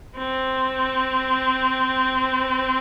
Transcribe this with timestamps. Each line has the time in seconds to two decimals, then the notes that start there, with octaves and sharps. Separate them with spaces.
0.17 C4